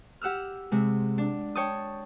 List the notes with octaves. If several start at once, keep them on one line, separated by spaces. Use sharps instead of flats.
G4 F#5 E6 F6
C3 G#3
D4
C#5 G5 A5 D#6